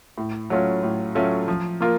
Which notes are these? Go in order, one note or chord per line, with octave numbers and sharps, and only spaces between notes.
A2
F#3 A3 C#4 F4
A2
F#3 A3 C#4 F4
F3
A#3 F4 A#4